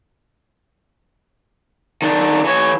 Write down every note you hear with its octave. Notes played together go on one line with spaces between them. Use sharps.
D#3 D4
E3 C#5